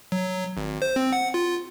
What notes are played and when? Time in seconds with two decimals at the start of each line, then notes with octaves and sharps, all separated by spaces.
0.12 F#3
0.57 G#1
0.82 C5
0.96 C4
1.13 F#5
1.34 F4